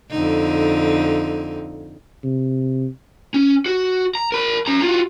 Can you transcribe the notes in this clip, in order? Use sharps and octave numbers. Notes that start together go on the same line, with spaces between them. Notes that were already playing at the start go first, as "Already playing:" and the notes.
F2 D3 D#4
C3
C#4
F#4
A#5
A#4 B5
C#4 A#5
F4 F#4